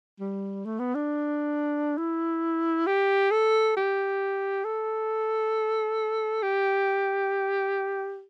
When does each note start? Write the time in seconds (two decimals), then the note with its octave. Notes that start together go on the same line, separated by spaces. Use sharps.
0.20 G3
0.65 A3
0.79 B3
0.95 D4
1.98 E4
2.87 G4
3.31 A4
3.77 G4
4.64 A4
6.42 G4